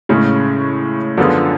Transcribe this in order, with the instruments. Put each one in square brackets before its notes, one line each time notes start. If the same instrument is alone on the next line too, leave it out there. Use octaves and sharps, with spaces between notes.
[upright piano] A2 G#3 C#4 [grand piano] C#3
[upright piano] F#2 F3 B3 F4 G#4 [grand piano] D3